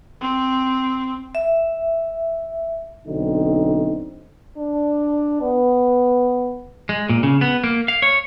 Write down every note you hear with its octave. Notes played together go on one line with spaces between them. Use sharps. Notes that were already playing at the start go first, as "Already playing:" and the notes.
C4
E5
B1 D3 C4 D#4
D4
B3
G#3
A#2
C#3
B3
A#3
F5
C#5